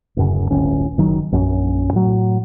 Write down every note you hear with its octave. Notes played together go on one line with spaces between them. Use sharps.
D1 F#2 C#3
D1 G1 C#4
F#1 D#3 F#3
A#1 F#2 C#4
A2 F#3